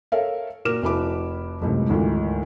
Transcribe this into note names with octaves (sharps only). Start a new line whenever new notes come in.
A4 A#4 C#5 E5 F5
A#2 F#4 A#4 D6 F6 E7
F1 E4 F#4 B5 D6
F#1 C#2 A2 C3
G#1 D2 E3 F4